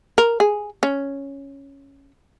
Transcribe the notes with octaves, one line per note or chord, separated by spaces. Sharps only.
A#4
G#4
C#4